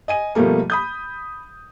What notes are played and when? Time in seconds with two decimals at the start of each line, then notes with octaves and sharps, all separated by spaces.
0.08 D#5 G#5 D#7
0.35 B2 F3 G3 A3 A#3
0.70 B5 D#6 G6